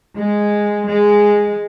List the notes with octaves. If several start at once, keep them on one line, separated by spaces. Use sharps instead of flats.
G#3
G#3